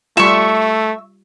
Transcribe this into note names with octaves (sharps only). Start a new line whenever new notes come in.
G3 A3 F4 E5 C#6